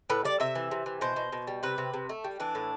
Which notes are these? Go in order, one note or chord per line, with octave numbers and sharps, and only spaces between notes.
A2 B4
G3 D5
C3 E5
E3
C3
E3
B2 C5
B2
B2
G3
C3 B4
C3
C3
A3
G3
E3 D4
A2